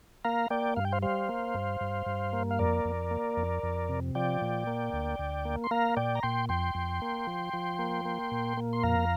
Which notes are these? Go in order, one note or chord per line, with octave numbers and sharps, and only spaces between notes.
A#3 F5 A#5
A#3 D5 G5
G2 F5
G5
C5 F5
G3 C5 F5
A#3
G2
G2
G2
A#3
F5
F2 A#4 D5
F2
A#3
F2
F2
C3
F3 D5 G5
A#2
A#3
D2
D2
A#3
C6
A#3 F5 A#5
A#2 D5 G5
A#5
A#2 G5 C6
F2 G5 C6
F2
A#3
F3
F3
A#3
A#3
A#2
A#3
C6
F2 F5 A#5